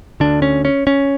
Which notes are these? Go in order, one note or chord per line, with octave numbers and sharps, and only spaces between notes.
D2 D3 D4
C#4
C#4
C#4